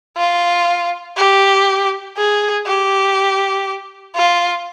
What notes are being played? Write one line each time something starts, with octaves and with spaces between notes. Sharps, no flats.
F4
G4
G#4
G4
F4